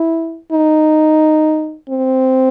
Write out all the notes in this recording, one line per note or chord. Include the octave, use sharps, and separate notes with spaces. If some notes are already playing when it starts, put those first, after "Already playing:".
Already playing: E4
D#4
C4